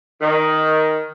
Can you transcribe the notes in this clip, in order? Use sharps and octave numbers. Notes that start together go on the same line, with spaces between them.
D#3